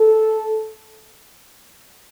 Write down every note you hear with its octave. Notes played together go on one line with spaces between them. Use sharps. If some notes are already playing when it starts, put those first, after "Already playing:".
Already playing: A4